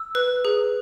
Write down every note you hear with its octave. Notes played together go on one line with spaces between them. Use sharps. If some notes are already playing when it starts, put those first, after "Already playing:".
Already playing: E6
B4
G#4